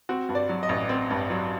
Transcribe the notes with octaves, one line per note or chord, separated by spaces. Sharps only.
C4 F#4
G2
D5
F#3
D#5
A1
C4
G2
F#3